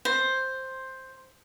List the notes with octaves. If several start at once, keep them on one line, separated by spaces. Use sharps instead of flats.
C5